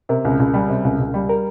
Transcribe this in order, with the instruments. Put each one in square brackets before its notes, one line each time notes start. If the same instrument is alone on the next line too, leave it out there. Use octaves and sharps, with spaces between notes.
[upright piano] C3 [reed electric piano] A#4
[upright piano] C#2
C#2
G3
C3
C#2
C#2
G3
[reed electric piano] A#4